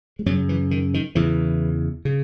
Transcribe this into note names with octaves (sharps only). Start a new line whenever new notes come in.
G#3
F#2 C#3 F#3
E3
D#3
D#3
E2 C#3 E3
C#3